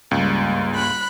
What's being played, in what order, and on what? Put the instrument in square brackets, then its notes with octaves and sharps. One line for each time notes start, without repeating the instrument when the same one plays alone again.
[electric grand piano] C#2 [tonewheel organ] G2 A#3 C6 [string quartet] G3
[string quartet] B5 F#6